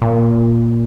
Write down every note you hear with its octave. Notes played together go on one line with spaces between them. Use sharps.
A#2